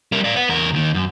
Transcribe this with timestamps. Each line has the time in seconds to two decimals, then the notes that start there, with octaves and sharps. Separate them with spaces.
0.12 G3 A#4
0.24 D5 F5
0.36 B4 F#5
0.49 E2 A#4
0.74 D#2 D#3
0.94 F#2